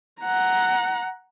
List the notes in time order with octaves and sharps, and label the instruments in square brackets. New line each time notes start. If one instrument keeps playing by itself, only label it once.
[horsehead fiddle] F#5 A#5